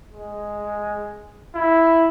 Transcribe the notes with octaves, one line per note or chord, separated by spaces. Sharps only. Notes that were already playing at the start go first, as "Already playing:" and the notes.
G#3
E4